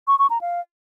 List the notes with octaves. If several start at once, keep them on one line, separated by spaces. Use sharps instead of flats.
C#6
C#6
A#5
F5